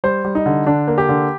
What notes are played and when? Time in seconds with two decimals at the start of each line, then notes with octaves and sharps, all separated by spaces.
0.04 G3 C5
0.25 G3
0.35 D#4
0.46 D3
0.66 D3 D4
0.88 A#3
0.98 G4
1.09 D3